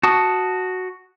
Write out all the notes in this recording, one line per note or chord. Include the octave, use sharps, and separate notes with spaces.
F#4 A5 D#6